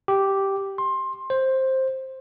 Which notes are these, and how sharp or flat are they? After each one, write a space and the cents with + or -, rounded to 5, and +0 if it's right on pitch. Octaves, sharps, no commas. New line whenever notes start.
G4 -5
C6 +20
C5 +10